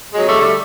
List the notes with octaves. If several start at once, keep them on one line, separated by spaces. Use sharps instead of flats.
F2 F#3 G#3
G3 A3
D3
G3 A3